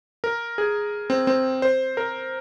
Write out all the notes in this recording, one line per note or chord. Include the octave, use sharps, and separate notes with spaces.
A#4
G#4
C4
C4
C5
A#4